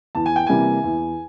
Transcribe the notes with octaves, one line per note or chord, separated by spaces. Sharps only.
E2 A5
G#5
G5
C3 E3 G3 A#3 G#5
E2